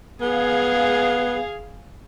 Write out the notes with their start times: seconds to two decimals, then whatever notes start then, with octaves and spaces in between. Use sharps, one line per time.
0.21 B3 G#4 F5